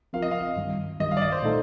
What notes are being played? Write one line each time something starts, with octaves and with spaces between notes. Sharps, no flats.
F3 C4 F4 A#4 F5
D#5
F5
G2 D#3 G3
G2 D#3 G3 D#5
F5
D5
D#5
C5
A#2 A3 D#4 A4